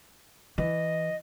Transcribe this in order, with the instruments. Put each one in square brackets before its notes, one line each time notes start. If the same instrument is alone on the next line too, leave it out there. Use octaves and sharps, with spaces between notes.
[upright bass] E3 [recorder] D#5